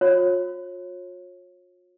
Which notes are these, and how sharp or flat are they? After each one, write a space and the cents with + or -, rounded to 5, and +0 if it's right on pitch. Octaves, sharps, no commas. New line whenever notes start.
F4 +45 C#5 -30